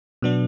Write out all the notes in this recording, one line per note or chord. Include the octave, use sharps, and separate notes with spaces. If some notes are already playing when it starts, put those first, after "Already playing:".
B2 F#3 B3 D4